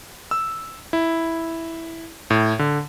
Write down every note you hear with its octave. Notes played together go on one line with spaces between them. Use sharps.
E6
E4
A2
D3